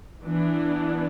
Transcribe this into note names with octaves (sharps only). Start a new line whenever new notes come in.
E3 B3 D4